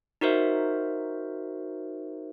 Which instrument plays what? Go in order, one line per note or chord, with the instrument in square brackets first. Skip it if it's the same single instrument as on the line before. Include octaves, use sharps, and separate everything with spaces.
[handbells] D#4 F#4 A#4 C5 E5